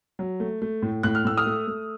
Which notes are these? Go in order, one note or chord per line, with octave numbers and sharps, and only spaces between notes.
F#3
A3
A3
A2
A2 F#6
F6
A2 E6
D#6 F6
A3
A3